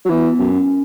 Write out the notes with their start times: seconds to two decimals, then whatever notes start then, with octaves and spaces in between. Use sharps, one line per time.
0.05 F#3
0.10 E3 B3
0.39 F#2
0.53 C#4